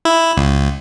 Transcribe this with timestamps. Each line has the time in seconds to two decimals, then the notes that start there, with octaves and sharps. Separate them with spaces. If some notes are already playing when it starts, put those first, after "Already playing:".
0.05 E4
0.37 C#2